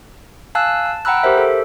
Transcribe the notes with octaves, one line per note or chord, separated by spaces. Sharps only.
F5 G#5 A5 E6 F#6
A5
F#5 G5 A#5 B5 E6 F#6
G4 A#4 C5 E5
A4